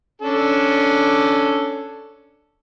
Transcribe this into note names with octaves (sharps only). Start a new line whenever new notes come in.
C#4 D4 A4